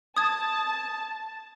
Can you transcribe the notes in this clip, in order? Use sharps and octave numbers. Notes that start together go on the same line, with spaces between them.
A5 D#6 G#6